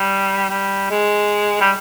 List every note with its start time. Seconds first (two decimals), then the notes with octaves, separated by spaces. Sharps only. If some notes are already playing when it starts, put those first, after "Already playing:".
Already playing: G3
0.50 G3
0.90 G#3
1.61 G3